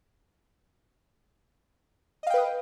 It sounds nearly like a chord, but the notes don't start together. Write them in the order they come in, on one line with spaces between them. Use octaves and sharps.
D#5 F5 G5 B4 D#6